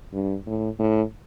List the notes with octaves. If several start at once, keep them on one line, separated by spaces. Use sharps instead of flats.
G2
A2
A2